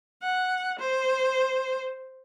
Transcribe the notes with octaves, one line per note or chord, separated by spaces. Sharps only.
F#5
C5